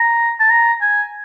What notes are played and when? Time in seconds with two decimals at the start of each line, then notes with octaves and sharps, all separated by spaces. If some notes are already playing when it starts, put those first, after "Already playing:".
Already playing: A#5
0.40 A5
0.50 A#5
0.81 G#5